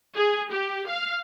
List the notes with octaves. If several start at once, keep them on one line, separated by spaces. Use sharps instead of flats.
G#4
G4
F5